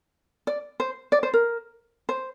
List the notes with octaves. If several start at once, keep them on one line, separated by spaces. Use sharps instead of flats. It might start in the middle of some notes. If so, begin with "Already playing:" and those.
D5
C5
D5
C5
A#4
C5